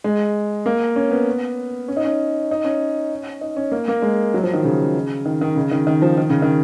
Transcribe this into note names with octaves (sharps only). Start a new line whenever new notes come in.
G#3
A#3
C#4
B3
C#4
D#4
C#4
D#4
C#4
D#4
C#4
A#3
A#3
G#3
F#3
F3
D#3
C#3
D#3
D#3
C#3
D#3
D#3
F3
D#3
C#3
D#3